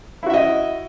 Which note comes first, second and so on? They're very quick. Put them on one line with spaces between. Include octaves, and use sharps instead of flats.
E4 F#4 E5 D#5